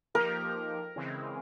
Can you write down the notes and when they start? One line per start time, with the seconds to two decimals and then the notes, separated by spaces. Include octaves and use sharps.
0.15 F3 A#3 D#4 G4 A#4
0.96 C#3 E3 G#3 C4